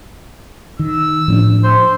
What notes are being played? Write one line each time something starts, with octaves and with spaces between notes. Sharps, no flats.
D#3 E6
A2 F3 C#4 D4
C5